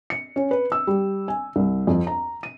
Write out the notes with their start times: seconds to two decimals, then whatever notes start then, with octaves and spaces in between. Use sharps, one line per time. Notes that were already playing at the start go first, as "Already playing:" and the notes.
0.10 C#7
0.36 C#4
0.51 B4
0.72 E6
0.87 G3
1.28 G#5
1.56 C2
1.87 F2
2.07 A#5
2.43 D#7